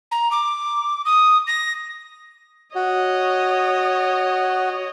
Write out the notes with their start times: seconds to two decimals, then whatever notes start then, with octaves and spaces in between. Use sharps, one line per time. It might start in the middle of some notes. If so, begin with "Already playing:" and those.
0.11 A#5
0.31 D6
1.05 D#6
1.47 A#6
2.75 F#4 C#5 D#5